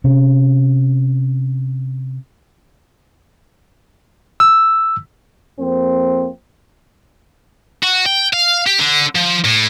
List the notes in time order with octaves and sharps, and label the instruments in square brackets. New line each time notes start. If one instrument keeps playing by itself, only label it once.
[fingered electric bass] C3 C#4
[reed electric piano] E6
[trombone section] F2 A#3 C4
[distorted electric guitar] F#4
G5
F5
G4
D3
F3
A2